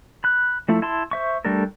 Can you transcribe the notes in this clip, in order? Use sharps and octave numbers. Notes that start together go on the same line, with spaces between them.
B5 F#6
F3 A3 E4
E4 A5 C6
C5 E5 C#6
G3 A3 D4 A4 A#4